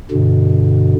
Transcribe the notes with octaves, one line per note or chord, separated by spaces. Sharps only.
G2 B2 D3